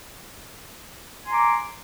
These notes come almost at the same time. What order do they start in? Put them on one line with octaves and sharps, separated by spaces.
G#5 C6 A#5 D6